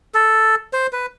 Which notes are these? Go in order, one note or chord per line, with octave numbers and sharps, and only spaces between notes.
A4
C5
B4